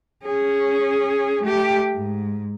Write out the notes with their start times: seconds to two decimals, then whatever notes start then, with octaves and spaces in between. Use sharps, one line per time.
0.24 C#4 G#4
1.44 A3 G4
1.94 G#2